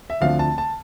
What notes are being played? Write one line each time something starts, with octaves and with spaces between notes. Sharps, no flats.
E5
D2 D3 F3 A3 C4 F5
A5
A5